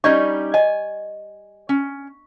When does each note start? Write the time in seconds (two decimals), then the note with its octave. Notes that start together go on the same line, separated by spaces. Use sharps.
0.04 G3 C#4 D#4 D5 D#5 C#6
0.54 D#5 G#5
1.69 C#4